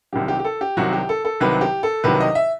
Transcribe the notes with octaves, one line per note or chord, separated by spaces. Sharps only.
C2 C3 D#3 F#3 G4
G4
G4
A4
G4
C2 C3 D#3 F#3 F#4
G4
A4
A4
C2 C3 D#3 F#3 B4
G4
A4
C2 C3 D#3 F#3 B4
D#5
E5